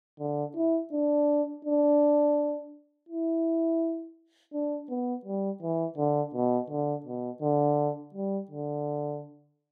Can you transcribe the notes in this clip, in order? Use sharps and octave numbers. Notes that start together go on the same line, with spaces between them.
D3
E4
D4
D4
E4
D4
B3
G3
E3
D3
B2
D3
B2
D3
G3
D3